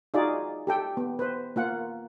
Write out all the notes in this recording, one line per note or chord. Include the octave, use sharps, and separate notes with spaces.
D#4 F4 F#4 G#4 D5
G4 A4 G5
B3
B4 C5
A#3 F4 F#5